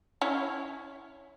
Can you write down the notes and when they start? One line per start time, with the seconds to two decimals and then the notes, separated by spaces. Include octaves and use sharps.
0.21 C#4 E4 C#5